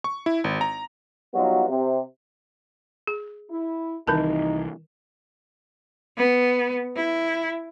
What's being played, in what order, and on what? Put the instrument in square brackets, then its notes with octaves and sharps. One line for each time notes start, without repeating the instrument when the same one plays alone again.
[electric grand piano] C#6
E4
G#1
A#5
[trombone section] F#3 G3 B3 D#4 F4 F#4
C3
[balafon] G#4
[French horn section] E4
[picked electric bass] C2 E3 [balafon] D#3 A#4 A5 [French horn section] D#4
[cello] B3
E4